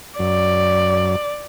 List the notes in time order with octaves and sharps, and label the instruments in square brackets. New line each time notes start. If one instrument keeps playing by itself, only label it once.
[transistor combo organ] F#2 [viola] D5